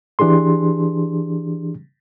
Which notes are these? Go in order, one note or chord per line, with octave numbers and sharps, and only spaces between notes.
E3 D4 G4 G#4 C6